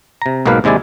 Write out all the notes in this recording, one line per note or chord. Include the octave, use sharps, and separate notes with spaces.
C3 A#5
B1 G#2 B2 A#3 B4 F5
D#2 C3 G#3 E4 D5 G#5